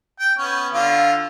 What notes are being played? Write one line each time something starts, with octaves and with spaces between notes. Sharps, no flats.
G5
B3 C#4
D3 F4